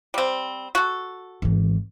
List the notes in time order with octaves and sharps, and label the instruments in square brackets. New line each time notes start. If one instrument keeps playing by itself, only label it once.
[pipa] G3 C4
F#4 A4
[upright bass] G#1 E3